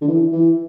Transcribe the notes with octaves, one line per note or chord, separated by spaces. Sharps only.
D3
E3
E3